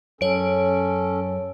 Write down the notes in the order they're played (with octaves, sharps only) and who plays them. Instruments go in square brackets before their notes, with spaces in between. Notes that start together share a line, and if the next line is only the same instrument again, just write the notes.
[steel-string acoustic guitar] F#2 [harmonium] C#4 A4 [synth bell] C#5 D7